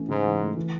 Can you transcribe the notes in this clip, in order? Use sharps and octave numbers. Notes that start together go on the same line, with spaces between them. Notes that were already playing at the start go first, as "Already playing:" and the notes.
Already playing: E3 A3 C#4
G#2 C#3
E3
A3
E3